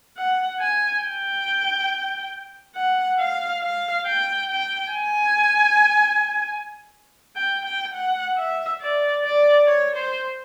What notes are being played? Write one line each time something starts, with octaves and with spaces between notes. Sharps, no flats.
F#5
G#5
G5
F#5
F5
F5
G5
G5
G#5
G5
G5
F#5
E5
D5
D5
C#5
C5